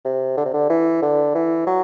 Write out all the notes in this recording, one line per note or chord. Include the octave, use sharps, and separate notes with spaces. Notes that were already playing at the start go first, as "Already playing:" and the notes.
C3
D3
C3
D3
E3
D3
E3
F#3